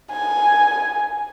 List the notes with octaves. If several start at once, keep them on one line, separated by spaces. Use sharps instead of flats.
G#5